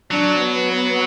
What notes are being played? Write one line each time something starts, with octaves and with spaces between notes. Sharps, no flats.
F#3 D4
B3
B3